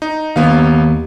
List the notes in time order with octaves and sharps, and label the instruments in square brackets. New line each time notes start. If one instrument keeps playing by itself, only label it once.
[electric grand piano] D#4
[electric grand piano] G1 B3 F5 [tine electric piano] D#2